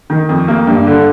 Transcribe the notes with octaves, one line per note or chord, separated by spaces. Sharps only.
D#3
F2
A#3
G2
D3